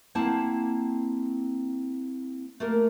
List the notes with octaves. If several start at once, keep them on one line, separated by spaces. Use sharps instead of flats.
A#3 C4 E4 F#5 A5
A3 A#3 A#4